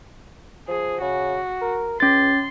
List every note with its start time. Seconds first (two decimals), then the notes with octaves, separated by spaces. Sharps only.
0.68 F3 G#4
1.01 C#3 F#4
1.61 A#4
2.00 C#2 C#4 C6 A6